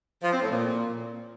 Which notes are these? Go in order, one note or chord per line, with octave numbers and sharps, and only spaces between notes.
F3
C4
A2
A#2